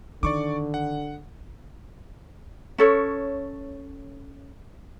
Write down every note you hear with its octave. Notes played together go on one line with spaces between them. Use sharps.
D3 D#3 D5 C#6 D6
F#5
C#4 A4 C#5